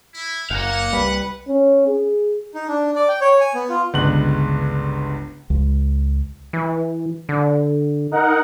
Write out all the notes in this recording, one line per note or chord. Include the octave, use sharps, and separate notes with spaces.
E4
F#1 A#3 F5 F#5
C2 G3 B4
C#4
G#4
D#4
D4
D5
G5
C#5
G#5
B3
F4
G1 C#2 G#3 B3 F#6 F#7
C#2
E3
D3
D#4 A#4 F#5